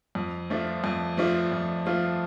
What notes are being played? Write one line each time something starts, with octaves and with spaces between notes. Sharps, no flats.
F2
F3 A3 D4 F4
F2
F3 A3 D4 F4
F2
F3 A3 D4 F4